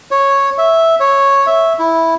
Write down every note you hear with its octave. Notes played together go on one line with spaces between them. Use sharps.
C#5
E5
C#5
E5
E4